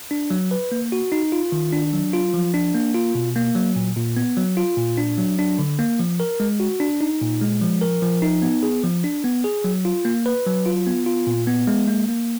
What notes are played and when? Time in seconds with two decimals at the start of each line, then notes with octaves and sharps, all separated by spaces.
0.11 D4
0.30 F#3
0.51 B4
0.72 A#3
0.92 F#4
1.12 D#4
1.32 F4
1.52 D#3
1.73 D4
1.93 F#3
2.13 F4
2.34 F3
2.54 D4
2.74 A#3
2.94 F4
3.15 B2
3.36 A#3
3.55 F#3
3.76 A#2
3.96 A#2
4.17 B3
4.37 F#3
4.57 F4
4.77 A#2
4.98 D4
5.18 F#3
5.39 D4
5.59 D3
5.79 A#3
5.99 F3
6.20 A#4
6.40 G#3
6.60 F#4
6.80 D4
7.01 D#4
7.21 A#2
7.41 G#3
7.62 F3
7.81 A#4
8.02 F3
8.22 D#4
8.42 B3
8.63 G#4
8.84 F3
9.04 D4
9.24 B3
9.44 G#4
9.64 F#3
9.85 F4
10.05 A#3
10.26 B4
10.46 F#3
10.66 F4
10.86 B3
11.06 F4
11.27 A#2
11.47 B3
11.67 G#3
11.88 A#3
12.09 A#3